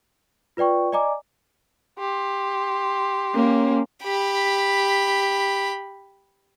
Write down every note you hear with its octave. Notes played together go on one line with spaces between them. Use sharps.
F4 B4 D5 G5 C#6
D5 D#5 G#5 A#5 D6
G4 C6
A#3 C#4
G4 B5